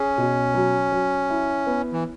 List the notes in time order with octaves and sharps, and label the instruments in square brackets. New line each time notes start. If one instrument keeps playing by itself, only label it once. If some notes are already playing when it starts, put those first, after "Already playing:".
Already playing: [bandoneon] C#4 [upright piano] G#4
[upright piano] B2
F#3
F#3
E4
B3
[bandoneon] E3